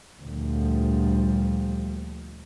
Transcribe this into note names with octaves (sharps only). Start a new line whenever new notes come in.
D2 A#2 F3 G3